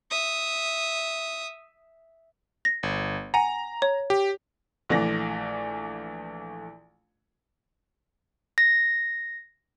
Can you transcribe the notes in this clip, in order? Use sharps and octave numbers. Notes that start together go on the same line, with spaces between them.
E5 D#6
A#6
G1
F#5 G#5 A#5
C#5
G4
A#1 E3 A3 D5 A#6
A#6